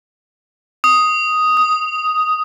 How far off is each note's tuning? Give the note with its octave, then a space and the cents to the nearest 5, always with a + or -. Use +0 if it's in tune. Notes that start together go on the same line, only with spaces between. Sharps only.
D#6 +0
D#6 +15